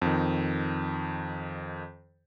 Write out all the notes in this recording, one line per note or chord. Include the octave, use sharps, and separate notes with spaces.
F2 D#3